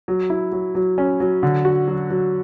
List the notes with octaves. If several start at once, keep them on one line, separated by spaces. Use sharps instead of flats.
F#3
E4
F#3
F#3
C#4
F#3
D3
F#4
F#3
F#3